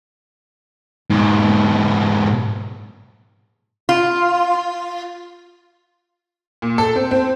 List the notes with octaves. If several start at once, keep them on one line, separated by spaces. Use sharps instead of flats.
G#2 B2
F4
A#2
A4
C4
C4